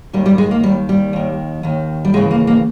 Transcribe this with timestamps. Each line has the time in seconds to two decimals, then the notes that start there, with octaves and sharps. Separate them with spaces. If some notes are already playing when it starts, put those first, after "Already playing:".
0.13 D#2 D#3 G3
0.26 G3
0.38 G#3
0.51 A#3
0.63 D#2 G3
0.66 D#3
0.89 G3
1.13 D#2 D#3
1.63 D#2 D#3
2.05 G3
2.14 D#2 C#3 E3 G#3
2.31 A#3
2.47 A#3